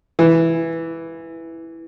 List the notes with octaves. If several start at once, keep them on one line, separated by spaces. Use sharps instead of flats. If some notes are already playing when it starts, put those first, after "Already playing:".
E3